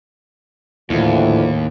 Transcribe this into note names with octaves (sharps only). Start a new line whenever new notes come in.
D#2 A2 D3 E3 F3